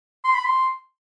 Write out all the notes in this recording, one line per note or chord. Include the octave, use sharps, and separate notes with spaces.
C6
B5
C6